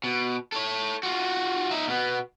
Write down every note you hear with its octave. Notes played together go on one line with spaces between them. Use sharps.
B2
A4 C#5
F4 F#4
D#4 E5
B2 B3